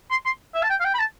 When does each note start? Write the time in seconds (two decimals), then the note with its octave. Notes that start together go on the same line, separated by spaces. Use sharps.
0.10 C6
0.25 C6
0.55 E5
0.63 A5
0.70 G5
0.80 F5
0.85 G5
0.94 B5
0.99 A5